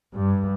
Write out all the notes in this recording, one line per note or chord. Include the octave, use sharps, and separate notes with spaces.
G2